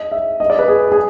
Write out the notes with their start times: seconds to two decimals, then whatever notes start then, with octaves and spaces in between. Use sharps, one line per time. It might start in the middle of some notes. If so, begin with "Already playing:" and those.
Already playing: D#5
0.12 E5
0.40 D#5
0.50 D5
0.59 B4
0.68 G#4
0.92 G#4